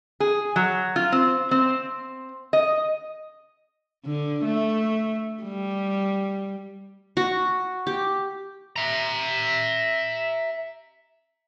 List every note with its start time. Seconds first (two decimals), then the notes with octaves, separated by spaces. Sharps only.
0.20 G#4
0.56 F#3
0.96 F4
1.12 C4
1.51 C4
2.53 D#5
4.05 D3
4.44 A3
5.43 G3
7.17 F#4
7.87 G4
8.76 E5 A#5